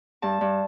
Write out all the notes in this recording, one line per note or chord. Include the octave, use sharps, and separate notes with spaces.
G2 A5
G2